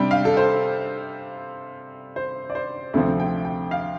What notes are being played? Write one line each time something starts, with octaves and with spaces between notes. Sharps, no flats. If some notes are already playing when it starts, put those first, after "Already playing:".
Already playing: C3 G3 D4 G5
F5
A4
C5
C5
D5
C5
D2 C3 F3 C4 A4
G5
G5
F5